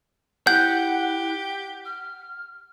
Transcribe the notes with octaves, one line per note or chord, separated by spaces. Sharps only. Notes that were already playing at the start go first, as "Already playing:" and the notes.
E4 G4 F#5 G6
F6